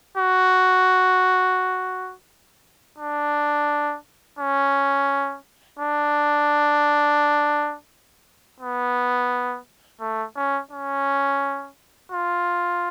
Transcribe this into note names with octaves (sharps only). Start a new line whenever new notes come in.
F#4
D4
C#4
D4
B3
A3
C#4
C#4
F4